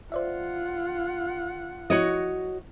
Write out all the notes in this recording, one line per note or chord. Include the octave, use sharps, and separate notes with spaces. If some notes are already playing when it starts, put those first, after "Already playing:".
F4 C5 D5 E5 F#5
F3 E4 F#4 C#5 D#5